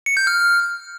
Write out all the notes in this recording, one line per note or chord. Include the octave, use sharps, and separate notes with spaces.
C#7
G6
F6